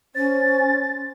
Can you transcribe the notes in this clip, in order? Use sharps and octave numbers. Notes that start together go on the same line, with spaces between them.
C#4 C5 A6